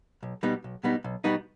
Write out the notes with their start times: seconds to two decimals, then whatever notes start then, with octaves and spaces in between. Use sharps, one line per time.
0.23 B1
0.43 B2 G3 B3 D#4
0.64 B1
0.84 B2 G3 B3 D#4
1.04 B1
1.24 B2 G3 B3 D#4